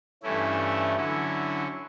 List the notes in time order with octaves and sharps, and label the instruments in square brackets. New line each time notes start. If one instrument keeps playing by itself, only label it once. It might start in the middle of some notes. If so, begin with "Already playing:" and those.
[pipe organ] G2 E3 A3 C#4 E4
D3 F#3 C#4 E4